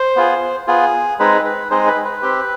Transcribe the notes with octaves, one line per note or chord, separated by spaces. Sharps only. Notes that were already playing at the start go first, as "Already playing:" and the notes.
Already playing: C5
B3 F4 G#4
B3 F4 G#4
G#3 C4 D#4 G#4 B4
B4
G#3 C4 D#4 G#4 C5
B4
B4
C4 G4